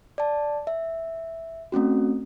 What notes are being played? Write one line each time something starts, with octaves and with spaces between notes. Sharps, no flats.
D5 A5
E5
A3 C4 C#4 F#4